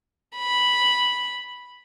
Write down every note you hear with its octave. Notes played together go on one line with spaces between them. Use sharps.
B5